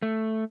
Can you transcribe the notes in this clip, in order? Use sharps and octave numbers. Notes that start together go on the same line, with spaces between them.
A3